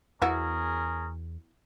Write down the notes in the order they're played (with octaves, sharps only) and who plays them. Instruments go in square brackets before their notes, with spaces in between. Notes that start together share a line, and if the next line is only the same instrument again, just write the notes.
[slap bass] E2 [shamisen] B3 E4 F#4 [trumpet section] C#4 G#4 A#4